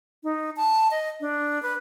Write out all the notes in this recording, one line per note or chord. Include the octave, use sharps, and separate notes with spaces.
D#4
A5
D#5
D4
B4